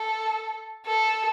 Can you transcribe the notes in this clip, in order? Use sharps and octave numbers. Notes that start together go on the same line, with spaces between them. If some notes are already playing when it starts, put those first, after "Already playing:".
Already playing: A4
A4